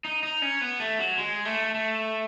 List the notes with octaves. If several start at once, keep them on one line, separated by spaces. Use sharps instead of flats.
D#4
D#4
C#4
B3
A3
F#3
G#3
A3
A3